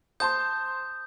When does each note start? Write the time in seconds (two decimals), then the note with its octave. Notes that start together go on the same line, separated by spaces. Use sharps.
0.20 C5 A5 C6 D#6 G6